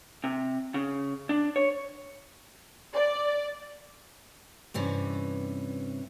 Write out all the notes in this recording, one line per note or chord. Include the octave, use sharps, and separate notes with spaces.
C3
C#3
D4
C#5
D5
G2 C3 E3 C#4